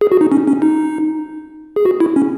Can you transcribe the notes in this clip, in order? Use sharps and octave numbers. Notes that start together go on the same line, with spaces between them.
G#4
F#4
D#4
C#4
C#4
D#4
G#4
F#4
E4
C#4